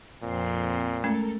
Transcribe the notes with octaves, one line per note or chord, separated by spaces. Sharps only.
F2 A#2 C4 C7
G#3 A3 C#4 A4 A#4